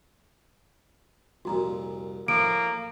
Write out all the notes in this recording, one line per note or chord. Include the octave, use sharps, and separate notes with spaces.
C2 F2 A#2 F#4 A#5
A2 F3 A#3 A4 D7